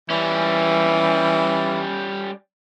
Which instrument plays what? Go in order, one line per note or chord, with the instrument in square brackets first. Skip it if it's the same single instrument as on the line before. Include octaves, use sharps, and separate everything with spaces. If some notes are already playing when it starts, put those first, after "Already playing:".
[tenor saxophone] E3 [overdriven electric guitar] G3 C#4